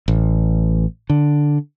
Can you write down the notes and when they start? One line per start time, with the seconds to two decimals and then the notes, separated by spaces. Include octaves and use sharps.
0.08 A1
1.10 D3